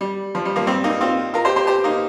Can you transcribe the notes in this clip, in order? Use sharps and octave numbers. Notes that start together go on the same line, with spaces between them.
G3
F3
G3
F3 A#3
G3 C4
A#3 D#4
C4 F4
F4 A#4
G4 C5
G4 C5
G4 C5
A#3 D#4